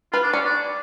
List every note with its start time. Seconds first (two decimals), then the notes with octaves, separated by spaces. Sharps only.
0.13 F4 B4
0.23 D4
0.33 C#4 D5
0.44 D4